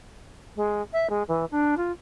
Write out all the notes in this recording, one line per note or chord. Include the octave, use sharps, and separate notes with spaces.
G#3
E5
G#3
E3
D4
F4